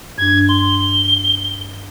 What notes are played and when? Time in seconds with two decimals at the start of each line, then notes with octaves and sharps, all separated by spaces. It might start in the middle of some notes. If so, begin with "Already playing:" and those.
0.18 G2 D4 G#6
0.49 C6 G7